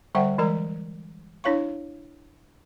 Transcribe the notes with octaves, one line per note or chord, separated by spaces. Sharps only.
D3 G3 C5 E5 F#5 G5
E3 G#3 A#4 D5 A#5
D4 E4 C#5 F5 C#6